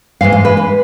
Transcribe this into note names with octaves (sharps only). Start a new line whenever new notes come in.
G#2 E3 G#3 F5
F5
B4
B4